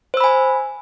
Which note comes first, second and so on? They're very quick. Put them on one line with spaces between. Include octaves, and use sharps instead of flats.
C5 E6 B5 G#5